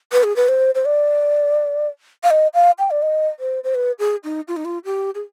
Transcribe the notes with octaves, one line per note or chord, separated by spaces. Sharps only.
B4
G#4
B4
C5
C5
D5
F5
D#5
F5
G5
D5
D#5
C5
C5
B4
G#4
D#4
F4
D#4
F4
G4
G#4